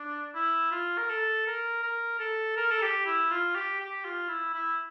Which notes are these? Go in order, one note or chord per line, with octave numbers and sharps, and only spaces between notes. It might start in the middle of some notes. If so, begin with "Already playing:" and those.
Already playing: D4
E4
F4
A#4
A4
A#4
A#4
A4
A#4
A4
G4
E4
F4
G4
G4
F4
E4
E4